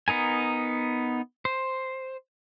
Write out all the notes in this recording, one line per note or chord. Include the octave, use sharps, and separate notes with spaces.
B3 D#4 A#4 G#5
C5